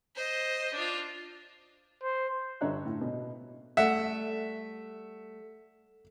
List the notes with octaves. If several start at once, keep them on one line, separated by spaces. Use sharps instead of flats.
C5 D#5
D4 F4
C5
G2 D3 C#5 E5 A#5 F#6
A2
B2
G3 A3 E5 F#5